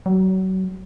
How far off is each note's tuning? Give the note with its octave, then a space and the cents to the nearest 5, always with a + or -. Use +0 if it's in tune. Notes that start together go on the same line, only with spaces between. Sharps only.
F#3 +30